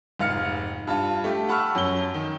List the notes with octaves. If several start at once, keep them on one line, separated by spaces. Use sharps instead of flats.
F1 G#2 F5 F6 C#7
G2 F4 A5
A3 G4
F#5 A5 B5 C#6 E6 F6
F#2 F#3 G7
D#3